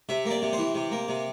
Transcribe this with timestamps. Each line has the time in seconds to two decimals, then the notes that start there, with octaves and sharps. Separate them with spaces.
0.09 C3 E5
0.25 A#3
0.31 D5
0.42 C3
0.53 E3 C5
0.75 C3
0.91 A#3
1.08 C3